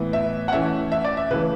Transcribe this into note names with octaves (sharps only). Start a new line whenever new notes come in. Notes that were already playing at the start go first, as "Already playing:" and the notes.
Already playing: A2 E3 B3
E5
F#5
E3 A3 C#4 E5
E5
D5
E5
C#3 E3 A3 B4